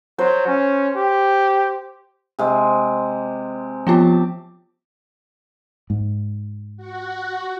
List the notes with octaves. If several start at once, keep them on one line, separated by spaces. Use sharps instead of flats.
F#3 C5
C#4
G4
C3 G#3
F3 B3 F4 G4 A5
G#2
F#4